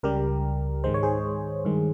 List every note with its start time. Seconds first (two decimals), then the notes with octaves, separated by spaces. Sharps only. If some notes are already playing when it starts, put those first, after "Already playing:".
0.03 C#2 C#3 G3 G4 A#4
0.84 G#2 D#3 G#3 C5
0.94 C#5
1.03 G#4 C5
1.65 G2 D#3 G#3